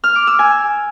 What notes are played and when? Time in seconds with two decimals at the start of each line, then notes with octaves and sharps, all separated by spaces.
0.04 F6
0.15 D6
0.27 E6
0.39 G#5